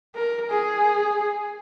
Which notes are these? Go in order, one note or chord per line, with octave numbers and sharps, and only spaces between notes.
A#4
G#4